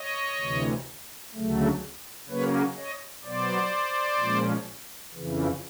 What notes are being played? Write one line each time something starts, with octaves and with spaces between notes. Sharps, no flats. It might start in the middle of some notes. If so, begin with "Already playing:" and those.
Already playing: C#5 D#5
D2 C3 E3
D2 C#3 F#3 A3
C#3 F#3 A#3 C#4 B4 C#5
C#5 D#5
B2 F#3 B3 C5 D5
A#2 F3 G#3 C#4
F2 C#3 E3